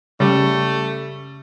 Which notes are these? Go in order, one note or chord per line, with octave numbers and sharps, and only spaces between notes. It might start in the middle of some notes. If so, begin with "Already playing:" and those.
C#3 G3 A3